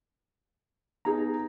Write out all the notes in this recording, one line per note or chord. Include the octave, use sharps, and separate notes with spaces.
B3 D#4 G#4 A#5